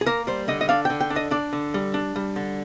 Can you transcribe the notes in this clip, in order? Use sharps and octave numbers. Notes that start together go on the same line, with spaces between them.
G#4
A#3 A#4
G3 C5
D3 D#5
D#5
D4 F5
D3 G5
G5
D4
D#5
D4 D5
D3
G3
D4
G3
D3